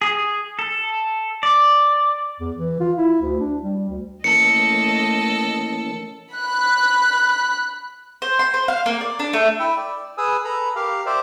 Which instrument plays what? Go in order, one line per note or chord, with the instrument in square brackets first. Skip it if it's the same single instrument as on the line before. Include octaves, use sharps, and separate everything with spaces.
[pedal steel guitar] G#4
A4
D5
[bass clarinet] E2
E3
F4
E4
D2
D4
G3
D2
[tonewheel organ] E3 A#3 C#4 [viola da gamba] A3 D#5 [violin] A4 [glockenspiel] C#7
[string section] B5 F#6
[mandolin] C5
C6
C5
F5
A#3
D5
D4
A3
[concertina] E4 E5 G5
D5
G#4 B4 G#5 D#6 E6
A4 B4 A#5 B5
G4 A#4 F5
G4 C5 D5 E5